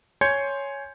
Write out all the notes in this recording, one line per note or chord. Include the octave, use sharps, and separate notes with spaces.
C#5 G#5 C6 G6 G#6 C#7